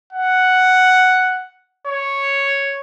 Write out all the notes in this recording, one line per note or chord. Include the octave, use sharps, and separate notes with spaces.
F#5
C#5